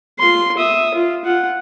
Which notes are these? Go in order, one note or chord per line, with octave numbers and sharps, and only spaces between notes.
F4 C6
E5 D#6
F4
F4 F#5